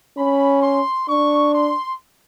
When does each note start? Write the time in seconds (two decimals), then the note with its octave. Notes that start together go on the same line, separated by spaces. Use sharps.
0.18 C#4 B5
0.63 C6
1.09 D4 C#6
1.54 C6